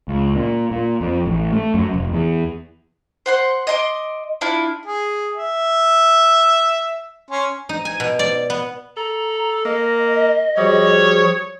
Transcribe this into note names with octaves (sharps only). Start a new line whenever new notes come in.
C#2
A#2
A#2
F2
A1
A3
F#2
F1
E2
C5 F#5 C6
D#5 C6 D6
D4 E4 F4
G#4
E5
C#4 C6
D#4
G#5
B2
D5
B3
A4 A#5
A#3 D#5
F3 G3 F#4 G#4 C#5